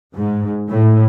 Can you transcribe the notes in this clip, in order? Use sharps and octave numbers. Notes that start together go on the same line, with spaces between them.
G#2
A2